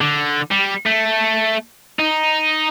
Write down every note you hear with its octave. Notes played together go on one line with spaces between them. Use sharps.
D3
G3
A3
D#4